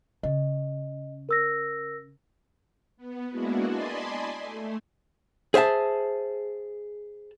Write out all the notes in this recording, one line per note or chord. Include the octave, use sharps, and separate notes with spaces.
C#3 D#5
A#4 E6 A#6
B3
G#3 A#3 B3 D4 E4 F#4
D5 D#5 G#5 A5 B5 C6
A3
G#4 C5 E5 F5 A5